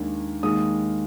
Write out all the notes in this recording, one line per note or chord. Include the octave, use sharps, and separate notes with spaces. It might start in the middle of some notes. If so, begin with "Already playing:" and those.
Already playing: D#2 D#3 G#3 D4
D#2 D#3 G#3 D#6